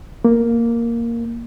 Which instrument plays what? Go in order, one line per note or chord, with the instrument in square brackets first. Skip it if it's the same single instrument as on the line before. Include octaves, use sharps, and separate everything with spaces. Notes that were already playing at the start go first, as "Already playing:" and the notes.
[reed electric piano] A#3